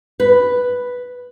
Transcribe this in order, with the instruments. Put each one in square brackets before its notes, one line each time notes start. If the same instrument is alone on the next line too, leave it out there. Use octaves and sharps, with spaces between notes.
[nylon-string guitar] B4